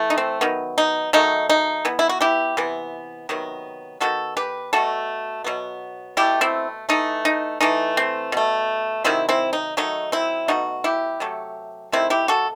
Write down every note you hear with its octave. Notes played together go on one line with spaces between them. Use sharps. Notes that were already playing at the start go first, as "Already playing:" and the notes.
Already playing: E3 A3
D#4
C4
D#3 F#3 B3
D#4
D#3 F#3 A3 D#4
D#4
E3 B3
E4
F#4
E4 G4
C3 E3 B3
C3 D#3 F#3 B3
D#3 G3 B3 F#4 A4
G4 B4
B2 A3 F#4 A4
B2 F#3 B3
B2 A3 E4 G4
C4 E4
E3 A3 D#4
D#4
E3 A3 D#4
C4
B2 A3
C3 D#3 F#3 C4 E4
C4 E4
D#4
D#3 F#3 A3 D#4
C4 E4
B2 A3 D#4 F#4
E4 G4
C3 F#3 A3
C3 D#3 A3 C4 E4
E4 G4
F#4 A4